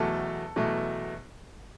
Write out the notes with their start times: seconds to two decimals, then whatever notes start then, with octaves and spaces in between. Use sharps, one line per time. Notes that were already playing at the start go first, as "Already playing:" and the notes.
Already playing: E2 B2 F#3 A3 A4
0.56 E2 B2 F#3 A3